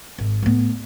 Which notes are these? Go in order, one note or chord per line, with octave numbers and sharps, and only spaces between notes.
G#1
A2 B3